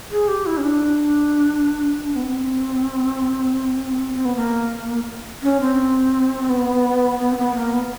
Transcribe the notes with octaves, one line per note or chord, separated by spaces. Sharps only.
G#4
G4
E4
C#4
D4
B3
C4
C4
B3
A#3
C#4
C4
B3
B3
C4
B3
A#3
B3